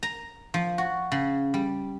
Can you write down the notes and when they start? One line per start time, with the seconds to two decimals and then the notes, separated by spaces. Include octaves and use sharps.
0.03 A#5
0.54 F3
0.78 F#4
1.12 C#3
1.54 G3